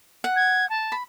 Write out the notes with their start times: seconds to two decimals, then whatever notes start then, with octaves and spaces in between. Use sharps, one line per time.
0.24 F#5
0.36 G#6
0.70 A5
0.92 B5